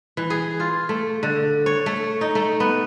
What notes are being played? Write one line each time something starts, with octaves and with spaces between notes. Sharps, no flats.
E3
G#4
F4
A3
D3
C#5
A3
D#4
A3
B3